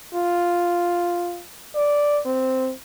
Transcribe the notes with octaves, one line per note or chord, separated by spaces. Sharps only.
F4
D5
C4